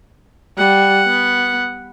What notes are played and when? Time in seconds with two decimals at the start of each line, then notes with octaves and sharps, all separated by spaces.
0.58 G3 F#5
1.06 B3